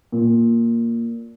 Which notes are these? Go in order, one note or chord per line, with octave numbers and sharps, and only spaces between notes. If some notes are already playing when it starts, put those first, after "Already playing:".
A#2